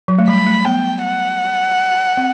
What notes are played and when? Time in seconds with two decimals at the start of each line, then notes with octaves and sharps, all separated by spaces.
0.08 F#3
0.18 A3
0.28 G3 B5
0.47 A3
0.65 B3 G5
1.04 F#5
2.17 C4